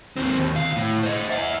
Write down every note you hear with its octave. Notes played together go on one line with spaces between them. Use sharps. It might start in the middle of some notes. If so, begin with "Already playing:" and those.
D#2 C4
D#2
D2 F5
A2
C5 D#5
E5 F#5